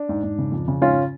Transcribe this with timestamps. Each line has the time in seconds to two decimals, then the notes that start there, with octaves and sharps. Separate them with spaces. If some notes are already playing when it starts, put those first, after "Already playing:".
Already playing: D4
0.09 G#2
0.23 G#2
0.38 C#3
0.52 F2
0.68 C#3
0.82 G#2 C#4 F4